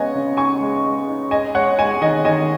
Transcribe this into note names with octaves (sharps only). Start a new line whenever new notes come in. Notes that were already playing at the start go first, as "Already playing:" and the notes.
Already playing: C#3 G#3 B3 C#5 D#5 F#5 G#5
C#3
D#4 G#5 C#6
G#3
G#3
D#4
G#3 D#5 G#5
G#3 C#5 F#5
G#3 D#5 G#5
D#3 D#5 G#5
D#3 D#5 G#5